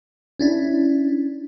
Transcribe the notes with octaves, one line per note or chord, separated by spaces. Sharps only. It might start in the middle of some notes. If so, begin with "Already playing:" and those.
C#4 D4 E4